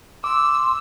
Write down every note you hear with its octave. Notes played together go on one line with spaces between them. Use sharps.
C6 D6 E6